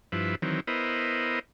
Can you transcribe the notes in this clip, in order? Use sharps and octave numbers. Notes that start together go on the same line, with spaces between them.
G2 F3 E4 B4
D#3 E3 F#3 C4
B3 E4 A#4 C5 D#5